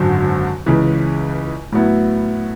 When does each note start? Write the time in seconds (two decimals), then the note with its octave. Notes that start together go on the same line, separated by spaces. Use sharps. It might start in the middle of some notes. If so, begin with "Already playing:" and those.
Already playing: G#1 F#2 D3 F#3
0.66 C#2 C#3 E3 G#3
1.72 A2 F#3 B3 E4